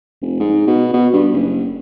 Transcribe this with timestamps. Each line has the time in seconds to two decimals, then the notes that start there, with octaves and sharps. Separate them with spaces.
0.22 F1
0.40 G#2
0.67 B2
0.93 B2
1.13 G2
1.32 F#1